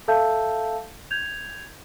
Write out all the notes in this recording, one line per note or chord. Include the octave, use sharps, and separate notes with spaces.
A4 E5 F5 A5 E6 G6
G6 G#6 F7